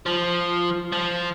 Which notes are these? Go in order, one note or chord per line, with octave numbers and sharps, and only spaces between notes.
F3
F3